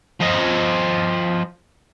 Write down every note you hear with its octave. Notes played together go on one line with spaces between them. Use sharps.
F3 D#5